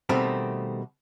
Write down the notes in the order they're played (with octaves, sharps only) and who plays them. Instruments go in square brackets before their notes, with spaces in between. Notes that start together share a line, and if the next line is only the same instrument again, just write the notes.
[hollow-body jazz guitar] B2 D#3 G3 A3 C4